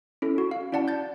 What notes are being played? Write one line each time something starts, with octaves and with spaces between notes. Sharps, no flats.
C#4 E4 A4
F#4
F5
C#4 E4 D5 F#5 A5
G6 A6